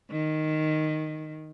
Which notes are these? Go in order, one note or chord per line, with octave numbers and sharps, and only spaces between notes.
D#3